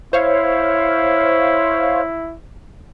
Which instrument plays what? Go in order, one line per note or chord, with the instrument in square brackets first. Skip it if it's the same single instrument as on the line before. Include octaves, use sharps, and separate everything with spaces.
[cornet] E4 [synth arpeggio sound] C5 C#5 F5